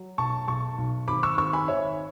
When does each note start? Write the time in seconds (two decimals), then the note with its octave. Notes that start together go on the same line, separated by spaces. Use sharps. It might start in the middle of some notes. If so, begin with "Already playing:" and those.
Already playing: F#3
0.18 B1 A5 C#6
0.48 B1 A5 C#6
0.78 B1
1.08 G#1 B5 D6
1.23 C#6 E6
1.38 G#1 C#6 E6
1.53 G#5 B5
1.68 G#1 C#5 E5